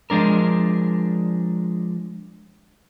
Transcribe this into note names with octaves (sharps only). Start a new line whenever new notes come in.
F3 G#3 D4 A#4